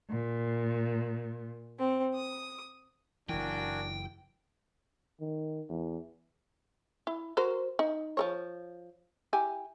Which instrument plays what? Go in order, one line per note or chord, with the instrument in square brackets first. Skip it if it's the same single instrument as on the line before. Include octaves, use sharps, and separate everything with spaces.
[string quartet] A#2
C4
D#6
[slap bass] F#1 E3 [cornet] D4 [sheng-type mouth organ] F#4 A#4 G#5 [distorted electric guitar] G5
[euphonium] D#3
E2
[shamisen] E4
F#4 A#4 C5
D#4
F3 A#4 C#5
E4 G4 G#5